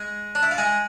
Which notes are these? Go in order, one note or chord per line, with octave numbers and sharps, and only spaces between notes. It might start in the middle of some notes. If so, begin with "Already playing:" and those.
Already playing: G#3 G#4
D4
E4
F4
G#3 G#4